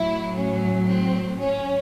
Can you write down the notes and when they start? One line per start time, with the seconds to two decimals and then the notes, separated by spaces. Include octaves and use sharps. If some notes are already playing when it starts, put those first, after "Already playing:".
Already playing: A2 F#3 E4
0.36 C#4
0.87 C4
1.38 C#4